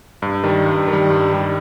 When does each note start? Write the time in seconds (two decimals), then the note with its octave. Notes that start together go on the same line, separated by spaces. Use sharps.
0.22 G2
0.43 D#3 G3
0.66 G2
0.88 D#3
0.93 G3
1.10 G2
1.31 D#3 G3